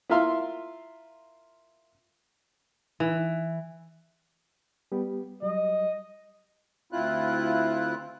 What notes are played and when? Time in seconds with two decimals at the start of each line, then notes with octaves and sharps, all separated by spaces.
0.10 E4 F4 A#4 E5 F5 C6
3.00 E3
4.92 G3 B3 G4
5.42 F#3 G3 D#5
6.92 D2 C4 E4 F4 F#6